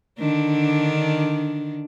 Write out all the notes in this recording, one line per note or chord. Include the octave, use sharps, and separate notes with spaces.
D3 D#3 D4